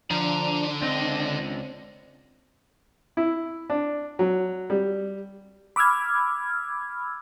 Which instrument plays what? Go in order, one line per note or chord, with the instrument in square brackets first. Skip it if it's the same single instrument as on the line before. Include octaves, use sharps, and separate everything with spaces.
[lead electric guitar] D3 [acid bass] F3 [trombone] D4 [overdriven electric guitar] A#5
[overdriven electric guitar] C#2 D#5 [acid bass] C4
[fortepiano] E4
D4
F#3
G3
[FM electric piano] B5 D6 E6 F6 G#6